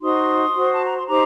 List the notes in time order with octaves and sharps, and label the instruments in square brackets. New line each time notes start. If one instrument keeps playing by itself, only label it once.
[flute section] D#4 F#4 C5 C6 D#6
F#4 C5
A5
A#5
C6
D#4 G4 C5 A#5 D6